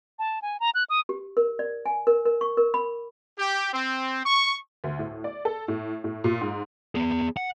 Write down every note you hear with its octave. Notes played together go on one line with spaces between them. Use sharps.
A5
G#5
A#5
F#6
D#6
G4
A#4
D5
G#5
A#4
A#4
C#6
A#4
B5
G4
C4
C#6
D2
A2
D5
A4
A2
A2
A#2
G#2
B3 G#4
F#5